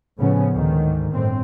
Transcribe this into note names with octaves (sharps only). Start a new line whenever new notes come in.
A2 C#3 F3 B3 C#4
D2 G#2 D#3
G1 A2 C4